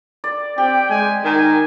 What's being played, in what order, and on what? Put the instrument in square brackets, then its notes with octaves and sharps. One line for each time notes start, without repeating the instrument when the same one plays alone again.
[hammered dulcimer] D5
[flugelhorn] C4 [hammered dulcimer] G4 [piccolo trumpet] G5
[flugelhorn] G#3 [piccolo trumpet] G#5
[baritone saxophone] D#3 [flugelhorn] A#4 [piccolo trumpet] G#5